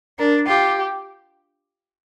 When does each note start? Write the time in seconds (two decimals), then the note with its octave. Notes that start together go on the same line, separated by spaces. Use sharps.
0.19 D4 A#4
0.47 F4 G4